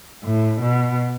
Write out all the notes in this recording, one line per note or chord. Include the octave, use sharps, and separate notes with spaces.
A2
B2